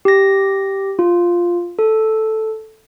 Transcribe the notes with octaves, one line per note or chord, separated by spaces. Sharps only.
G4 A#6
F4
A4